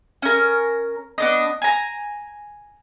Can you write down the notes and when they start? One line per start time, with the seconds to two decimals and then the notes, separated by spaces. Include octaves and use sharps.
0.22 C#4 A#4
1.18 B3 D4 D#5
1.62 G#5 A#5